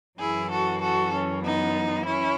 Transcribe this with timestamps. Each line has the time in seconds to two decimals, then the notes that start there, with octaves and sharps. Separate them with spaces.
0.19 F#2 E3 E4 G#4
0.50 F#4 A4
0.81 F#4 A4
1.12 C#4
1.43 B3 D#4
2.05 C#4 E4